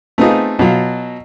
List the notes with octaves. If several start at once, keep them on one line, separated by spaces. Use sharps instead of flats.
A3 B3 C4 D#4 F4 G#4
B2 F#3 F4